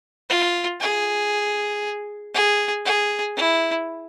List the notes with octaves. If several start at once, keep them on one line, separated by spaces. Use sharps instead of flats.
F4
G#4
G#4
G#4
E4